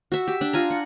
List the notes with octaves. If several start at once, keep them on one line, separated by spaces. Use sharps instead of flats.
F#4 E5
G4
D4
F4 G#5 A#5
F#5